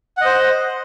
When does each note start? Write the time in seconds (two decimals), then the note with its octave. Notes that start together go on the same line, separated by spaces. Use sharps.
0.17 F#5
0.21 D#5
0.25 C5